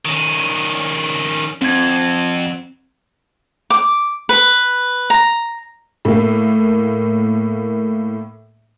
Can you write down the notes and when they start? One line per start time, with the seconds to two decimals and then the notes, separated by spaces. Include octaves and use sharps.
0.05 D#3 C#4
1.62 F2 C4 G#6
3.70 D6
4.29 B4
5.10 A#5
6.05 A2 A#3